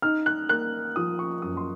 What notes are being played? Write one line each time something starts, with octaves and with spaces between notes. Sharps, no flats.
D#4 F6
F#6
A#3 F#6
F3 D#6
C#6
F#2 D#6
C6